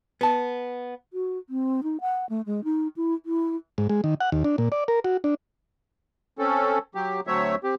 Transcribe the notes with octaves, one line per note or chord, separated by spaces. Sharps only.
B3 A5
F#4
C4
D#4
F#5
A3
G#3
D#4
E4
E4
G#2
G#3
D#3
F#5
D#2
D4
A#2
D5
A#4
F#4
D4
C4 C#4 A4
F#3 G4
D2 F#3 A3 C4 C#5 E5
C4 G4